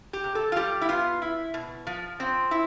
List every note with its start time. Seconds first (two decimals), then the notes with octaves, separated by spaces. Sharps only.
0.13 G4
0.24 C3
0.35 A4
0.52 F4
0.56 G3 G4
0.81 E4
0.89 B3 F4
1.22 E4
1.54 B2
1.87 F3
2.20 C4
2.51 E4